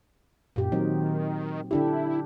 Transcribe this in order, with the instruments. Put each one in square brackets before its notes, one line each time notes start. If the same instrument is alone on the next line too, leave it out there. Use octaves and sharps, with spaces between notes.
[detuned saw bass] F#2 [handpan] A#2 G4
[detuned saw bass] D#3 [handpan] F#3 C4 D#4
[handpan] D3 D4 G4 [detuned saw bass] E4